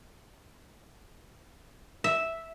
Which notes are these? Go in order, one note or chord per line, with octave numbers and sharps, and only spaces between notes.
E5